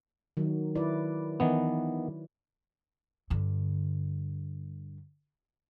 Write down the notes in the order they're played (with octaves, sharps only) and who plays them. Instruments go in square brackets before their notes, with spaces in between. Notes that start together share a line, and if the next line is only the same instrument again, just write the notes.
[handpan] D#3 F#3
E4 B4 D5
[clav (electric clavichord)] D#3 E3 B3
[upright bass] G2 D3